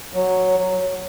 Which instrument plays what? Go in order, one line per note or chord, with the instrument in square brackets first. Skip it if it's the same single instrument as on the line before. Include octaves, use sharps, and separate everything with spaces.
[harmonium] F#3